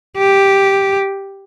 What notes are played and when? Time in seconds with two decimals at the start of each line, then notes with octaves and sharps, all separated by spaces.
0.17 G4